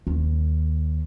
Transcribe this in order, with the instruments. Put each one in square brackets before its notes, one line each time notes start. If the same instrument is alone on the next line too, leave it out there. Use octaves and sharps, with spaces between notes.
[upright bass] D#2